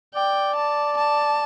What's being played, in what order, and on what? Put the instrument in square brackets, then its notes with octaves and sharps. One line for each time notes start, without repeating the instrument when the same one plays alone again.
[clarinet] D5 [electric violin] G5
[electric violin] A5
A5